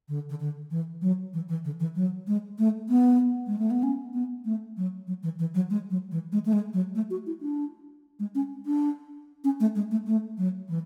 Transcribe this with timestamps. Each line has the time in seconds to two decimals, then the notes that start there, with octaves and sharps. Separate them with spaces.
0.09 D3
0.30 D3
0.40 D3
0.71 E3
1.02 F#3
1.33 E3
1.49 E3
1.65 D3
1.80 E3
1.95 F#3
2.27 G#3
2.59 A3
2.89 B3
3.47 G#3
3.59 A3
3.71 B3
3.83 C#4
4.14 B3
4.45 A3
4.77 F#3
5.07 F#3
5.23 E3
5.39 E3
5.55 F#3
5.70 G#3
5.90 F#3
6.12 E3
6.32 G#3
6.46 A3
6.53 G#3
6.73 F#3
6.95 A3
7.10 F#4
7.26 E4
7.41 D4
8.19 G#3
8.35 C#4
8.66 D4
9.44 C#4
9.60 A3
9.75 G#3
9.91 A3
10.07 A3
10.38 F#3
10.69 E3